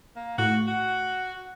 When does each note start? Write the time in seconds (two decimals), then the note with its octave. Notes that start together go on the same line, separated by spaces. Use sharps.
0.16 A#3
0.38 A2 F#4
0.67 F#4